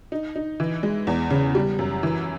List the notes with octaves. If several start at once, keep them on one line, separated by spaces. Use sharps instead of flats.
D#4
D#4
E3
G#3
E2
C#3
G3
F#2
E3